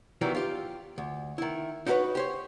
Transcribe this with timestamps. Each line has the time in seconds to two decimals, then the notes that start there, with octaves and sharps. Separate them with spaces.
0.21 D#3 E3 F#3 G3 B3
0.35 F4 G4
0.98 D2
1.38 D#3 E4
1.87 D#4 E4 F#4 G#4 B4 C#5
2.15 G4 C5 C#5